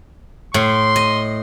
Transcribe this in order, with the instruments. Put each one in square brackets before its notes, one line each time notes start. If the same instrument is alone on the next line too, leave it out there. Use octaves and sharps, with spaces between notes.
[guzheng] A2 [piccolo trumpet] C6
[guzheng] D#5